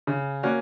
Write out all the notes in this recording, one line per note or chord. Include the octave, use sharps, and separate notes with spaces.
C#3
A#3 C#4 F#4